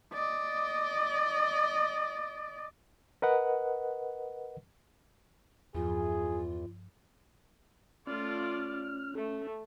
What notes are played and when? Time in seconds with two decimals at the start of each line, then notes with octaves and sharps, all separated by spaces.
0.13 D5 D#5
3.22 A#4 B4 D#5 F#5
5.75 E2 G2 F3 F4 G#4
8.07 A3 C#4 F4 D5 F6
9.15 A3 C#4 A4